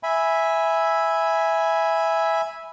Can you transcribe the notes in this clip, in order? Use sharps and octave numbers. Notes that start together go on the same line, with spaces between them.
E5 G#5 B5